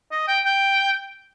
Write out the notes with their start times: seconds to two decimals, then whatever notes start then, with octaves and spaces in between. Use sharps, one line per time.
0.11 D#5
0.28 G5
0.45 G5